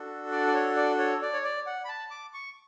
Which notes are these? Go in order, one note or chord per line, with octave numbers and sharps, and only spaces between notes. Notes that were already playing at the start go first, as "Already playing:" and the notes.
Already playing: D4 F#4 A4
D5
D5
C#5
D5
C#5
D5
C#5
D5
F#5
B5
A5
D6
C#6